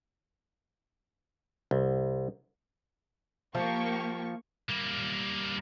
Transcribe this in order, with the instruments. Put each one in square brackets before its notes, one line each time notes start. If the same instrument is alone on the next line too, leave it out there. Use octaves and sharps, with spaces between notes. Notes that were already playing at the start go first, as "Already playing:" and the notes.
[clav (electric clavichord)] C2
[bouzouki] F3 [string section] A#3 G4 C#6
[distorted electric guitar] G3 A#3